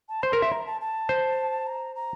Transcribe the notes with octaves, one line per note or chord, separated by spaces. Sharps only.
A5
C5 C6
A#4
E5
A#5
A5
A5
C5
A#5
A#5